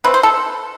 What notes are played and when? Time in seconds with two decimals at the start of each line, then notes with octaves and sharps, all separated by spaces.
0.04 D3 A3 C4 B4
0.14 C5
0.23 A4